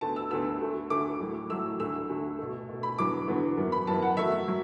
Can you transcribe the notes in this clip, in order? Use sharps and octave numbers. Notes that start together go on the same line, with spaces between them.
D2 D3 B3 A5
E6
D2 D3 B3 E6
D2 D3 A3
D2 D3 A3 D6
A2 F#3 A3
A2 F#3 A3 E6
D2 D3 A3 E6
D2 D3 A3
B2 A3
B2 A3
B5
E2 D3 F#3 B3 D6
E2 D3 F#3 B3
F#2 E3 B3
B5
F#2 E3 B3 A5
F#5
F#2 F#3 A3 E5
F#3